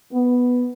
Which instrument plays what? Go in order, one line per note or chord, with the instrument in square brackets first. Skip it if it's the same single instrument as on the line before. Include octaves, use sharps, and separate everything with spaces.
[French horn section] B3